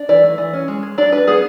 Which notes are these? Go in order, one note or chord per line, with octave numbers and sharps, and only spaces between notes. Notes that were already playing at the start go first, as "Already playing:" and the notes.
Already playing: D4
E3 D5
A3
E3
C#4
G#3
G#3
D4 D5
D4 B4
B3 G#4